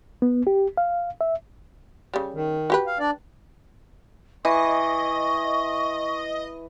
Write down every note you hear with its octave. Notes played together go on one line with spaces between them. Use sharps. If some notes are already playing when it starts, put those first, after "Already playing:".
B3
G4
F5
E5
C#3 G3
D#3
F#4 G4 B4
F5
D4 D5
E3 D#5 C#6